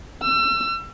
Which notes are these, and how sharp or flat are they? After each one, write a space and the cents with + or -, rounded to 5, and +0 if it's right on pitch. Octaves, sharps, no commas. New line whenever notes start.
E6 +35